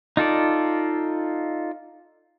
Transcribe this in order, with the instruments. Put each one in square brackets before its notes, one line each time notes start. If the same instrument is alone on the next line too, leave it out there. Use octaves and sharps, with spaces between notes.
[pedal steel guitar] D#4 F4 A4 D5